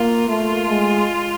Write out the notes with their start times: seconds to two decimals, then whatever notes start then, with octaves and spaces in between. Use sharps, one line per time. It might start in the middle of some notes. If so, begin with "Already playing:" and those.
Already playing: A#3 F4
0.29 A3 F4
0.69 G#3